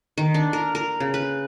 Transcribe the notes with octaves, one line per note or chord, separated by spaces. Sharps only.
D#3
D4
A#4
A#4
C#3
B4